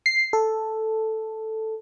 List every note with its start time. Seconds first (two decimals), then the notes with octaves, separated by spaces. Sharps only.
0.06 C7
0.33 A4